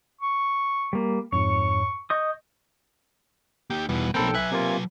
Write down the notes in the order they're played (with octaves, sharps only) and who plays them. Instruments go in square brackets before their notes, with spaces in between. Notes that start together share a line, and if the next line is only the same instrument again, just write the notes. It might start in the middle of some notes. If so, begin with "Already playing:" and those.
[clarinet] C#6
[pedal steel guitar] G3 A#3
[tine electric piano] F2 G#2 [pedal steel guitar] C#5 [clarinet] C#6
[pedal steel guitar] D#5 C#6 D#6 [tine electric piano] G6
[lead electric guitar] A#3 D#4 [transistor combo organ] G4
[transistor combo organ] E2 B2 [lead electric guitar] G3 D#4
[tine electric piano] B1 A4 G5 [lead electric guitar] F3 B5 [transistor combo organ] A#3 C4
[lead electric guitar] F#3 B4 [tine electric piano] E5 F#6 [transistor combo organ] G#5
[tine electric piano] C3 A#3 F4